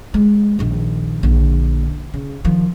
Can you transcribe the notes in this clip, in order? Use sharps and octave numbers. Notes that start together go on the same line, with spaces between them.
G#3
A#1 D#3
A#1 D3
C#3
D#3 F3